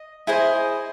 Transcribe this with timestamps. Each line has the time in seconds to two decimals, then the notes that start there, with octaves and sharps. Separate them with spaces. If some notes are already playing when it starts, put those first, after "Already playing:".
Already playing: D#5
0.27 E4 G#4 C5 D#5